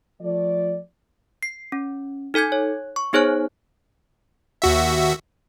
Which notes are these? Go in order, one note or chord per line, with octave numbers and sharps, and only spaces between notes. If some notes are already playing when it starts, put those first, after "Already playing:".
F3 A3 D5
C7
C#4
D#4 A4 G#5 G6 G#6
C#5
C#6
B3 D#4 G#4 C5 C#5 F#6
D#2 F#4 E5